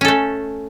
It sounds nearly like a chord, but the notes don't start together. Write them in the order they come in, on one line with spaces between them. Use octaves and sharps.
C#4 A4 A3